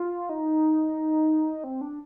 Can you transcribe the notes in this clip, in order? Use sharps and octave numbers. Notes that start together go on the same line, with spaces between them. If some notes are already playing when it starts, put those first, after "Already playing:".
Already playing: F4
D#4
C4
D4